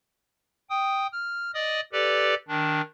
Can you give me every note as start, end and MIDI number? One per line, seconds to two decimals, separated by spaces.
0.70 1.07 79
0.70 1.07 87
1.13 1.51 89
1.54 1.80 74
1.54 1.80 75
1.54 1.80 87
1.93 2.35 67
1.93 2.35 69
1.93 2.35 71
1.93 2.35 74
2.48 2.81 51
2.48 2.81 62